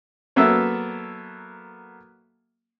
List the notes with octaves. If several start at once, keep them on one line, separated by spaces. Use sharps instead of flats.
F#3 A#3 B3 A4 E5